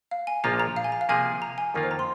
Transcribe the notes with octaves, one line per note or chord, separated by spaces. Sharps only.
F5
G#5
A#1 A#2 F3 A#3 F4 A#5
A#5
F5
G#5
A#5
F5
C3 F3 A#3 G#4 G#5
A#5
G#5
F2 D#3 A#3 F4 A#4
C5
A#5
C6